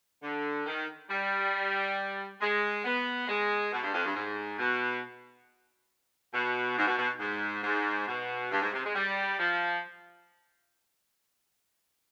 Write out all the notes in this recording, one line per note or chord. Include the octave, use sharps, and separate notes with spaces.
D3
D#3
G3
G#3
B3
G#3
B2
G2
F2
G2
G#2
B2
B2
G#2
B2
B2
G#2
G#2
B2
G2
G#2
C3
G#3
G3
F3